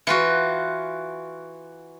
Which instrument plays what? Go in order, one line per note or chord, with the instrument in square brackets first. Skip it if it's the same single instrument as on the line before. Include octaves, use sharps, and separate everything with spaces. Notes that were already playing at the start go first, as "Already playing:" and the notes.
[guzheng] E3 F4 F#4